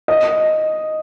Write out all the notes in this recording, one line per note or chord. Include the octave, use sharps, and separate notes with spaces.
D#5